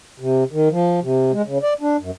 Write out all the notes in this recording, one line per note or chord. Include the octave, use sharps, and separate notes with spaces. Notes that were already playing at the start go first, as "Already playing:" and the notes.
C3
D#3
F3
C3
G#3
C#3
D5
D4
F#2